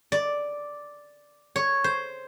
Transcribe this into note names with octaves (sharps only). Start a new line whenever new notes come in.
D5
C#5
C5